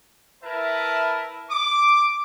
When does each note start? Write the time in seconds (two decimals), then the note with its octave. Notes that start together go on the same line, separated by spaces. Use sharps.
0.43 E4 A#4 B4 E5 A5
1.50 D6